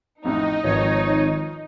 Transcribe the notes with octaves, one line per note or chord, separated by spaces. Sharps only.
A1 F2 A2 D#4
G#1 D#3 F3 B4 C#5